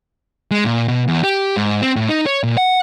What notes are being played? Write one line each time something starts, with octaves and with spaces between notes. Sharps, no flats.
G#3
A#2
B2
E2
G4
G#2
C4
A2
D#4
C#5
A#2
F#5